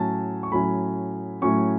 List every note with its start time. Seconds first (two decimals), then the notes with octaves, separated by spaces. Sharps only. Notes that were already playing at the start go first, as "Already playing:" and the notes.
Already playing: A2 F#3 C#4 A5
0.43 C#6
0.52 A2 F#3 C#4 B5
1.42 A2 F#3 C#4 C#6